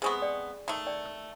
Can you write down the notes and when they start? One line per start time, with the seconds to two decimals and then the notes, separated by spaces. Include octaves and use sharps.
0.02 C3 G#3 B3 G#4 G#5 C#6
0.22 D5 G5
0.68 D#3 A3
0.87 D5 G5
1.06 E6